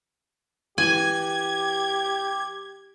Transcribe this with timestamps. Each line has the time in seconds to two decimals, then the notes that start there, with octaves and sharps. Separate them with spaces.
0.78 E3 G4 G#5 G#6